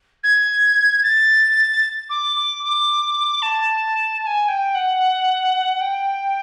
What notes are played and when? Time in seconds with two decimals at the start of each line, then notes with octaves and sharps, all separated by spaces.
0.24 G#6
1.03 A6
2.10 D6
2.36 D6
2.63 D6
3.42 A5
4.22 A5
4.27 G#5
4.48 G5
4.75 F#5
5.81 G5